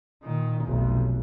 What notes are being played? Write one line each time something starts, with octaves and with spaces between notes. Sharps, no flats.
A#2 D#3
F1 B1